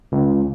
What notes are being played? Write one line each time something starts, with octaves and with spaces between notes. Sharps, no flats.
C#2